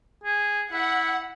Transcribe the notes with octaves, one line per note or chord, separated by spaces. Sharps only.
G#4
E4 F#5